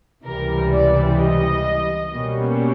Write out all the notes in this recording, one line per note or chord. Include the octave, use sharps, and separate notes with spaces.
C#2 C3 E3 G3 A#4
D5
D#5
B2 G3 A#3 C#4